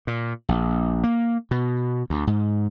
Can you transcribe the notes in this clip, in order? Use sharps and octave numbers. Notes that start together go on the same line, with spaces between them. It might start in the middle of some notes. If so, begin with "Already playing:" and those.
A#2
A#1
A#3
B2
D2
G#2